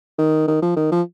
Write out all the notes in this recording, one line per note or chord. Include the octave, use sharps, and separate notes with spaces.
D#3
D#3
F3
D#3
F3